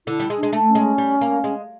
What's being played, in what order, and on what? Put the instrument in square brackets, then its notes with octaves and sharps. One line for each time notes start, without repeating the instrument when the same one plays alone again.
[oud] D3 [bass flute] E4
[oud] G3
G#3
[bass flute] D4
[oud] G#3
A3
[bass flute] C#4
[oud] G#3
G3
A#3
G#3